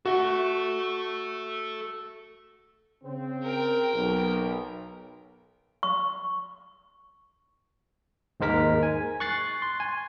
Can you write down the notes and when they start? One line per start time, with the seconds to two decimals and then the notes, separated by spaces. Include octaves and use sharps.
0.05 F#4 A4 E5
3.03 C#3 C4
3.44 A#4 G5
3.92 B1
5.83 C#6
8.40 D#2 G#2 G#3 A#4 B6
8.83 G#5
9.20 C#6 F#6 A6 C7
9.62 C6
9.80 G#5